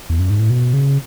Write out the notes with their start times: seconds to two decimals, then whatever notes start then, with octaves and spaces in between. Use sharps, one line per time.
0.09 E2
0.19 F#2
0.30 G#2
0.39 A2
0.50 B2
0.73 C#3